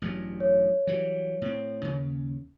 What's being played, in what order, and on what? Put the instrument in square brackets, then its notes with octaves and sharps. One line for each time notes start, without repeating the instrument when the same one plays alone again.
[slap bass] A1 G2 F#3
[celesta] C#5
[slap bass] E3 F#3 G3
A2 C4
D#2 C#3